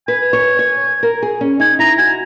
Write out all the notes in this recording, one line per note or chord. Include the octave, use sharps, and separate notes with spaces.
B4 G#5
C#5
C#5
A#4
G#4
C#4
D#4 G#5
E4 A#5
F#4 G#5